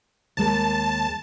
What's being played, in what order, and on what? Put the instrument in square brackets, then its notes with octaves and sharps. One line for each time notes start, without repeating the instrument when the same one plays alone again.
[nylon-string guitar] D#2 G#3 A#4 [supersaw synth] A5